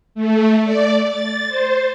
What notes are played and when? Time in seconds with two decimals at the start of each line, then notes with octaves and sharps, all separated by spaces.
0.15 A3
0.64 D5
1.07 A6
1.49 C5